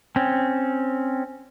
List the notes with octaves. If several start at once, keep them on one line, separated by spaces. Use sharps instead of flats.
C4 C#4